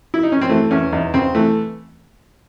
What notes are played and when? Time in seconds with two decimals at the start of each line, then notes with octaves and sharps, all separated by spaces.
0.14 E4
0.23 D#4
0.32 C#4
0.41 C4
0.49 E3 A3
0.71 E2 C#4
0.92 E2 D#4
1.14 C#3 C4
1.35 E3 A3